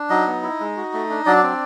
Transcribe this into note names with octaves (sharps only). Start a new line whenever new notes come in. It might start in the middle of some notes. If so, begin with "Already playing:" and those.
Already playing: D4
F#3 D#4 D#5
B3
E4
G#3
F#4
A3
D4
F#3 D4 D5
C4